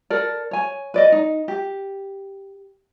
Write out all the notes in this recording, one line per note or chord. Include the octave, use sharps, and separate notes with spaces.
A4 A#4 D5
C#5 G#5
B4 D5 D#5
D#4
G4